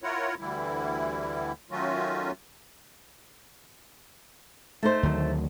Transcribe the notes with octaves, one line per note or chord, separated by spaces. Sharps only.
E4 F4 A#4 C#5 F#5
D2 D3 E3 G3 E4
D#3 F#3 A3 C#4 F4 F#4
A3 D#4 C5
D2 D#3 F#3